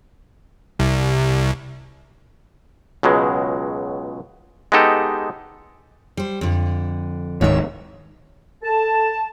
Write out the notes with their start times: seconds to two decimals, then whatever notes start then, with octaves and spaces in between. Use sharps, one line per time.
0.79 C2
3.03 C#2 B2 F#3 G#3
4.72 G#3 B3 D#4 G4 A4
6.17 G3 C5
6.41 F2 D3
7.41 D1 G#2 D#3 C#5 E5
8.64 A4 A5